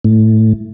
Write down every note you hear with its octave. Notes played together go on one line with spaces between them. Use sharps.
A2